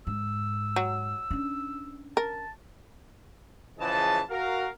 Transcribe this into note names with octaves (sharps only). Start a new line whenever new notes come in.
G#2 E6
F#3
C#4 D4
A#4 A5
C#3 E3 F3 G#4 D#5 A5
F#4 A#4 F5